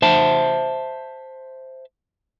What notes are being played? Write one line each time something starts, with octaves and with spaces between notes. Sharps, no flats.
C5 E5 A5